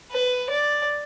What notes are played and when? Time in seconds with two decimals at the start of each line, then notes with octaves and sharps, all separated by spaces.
0.11 B4
0.50 D5